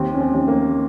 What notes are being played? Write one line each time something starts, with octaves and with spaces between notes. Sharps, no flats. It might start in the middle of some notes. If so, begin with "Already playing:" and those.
Already playing: D#2 C4
C#4
C4
D#2
A#3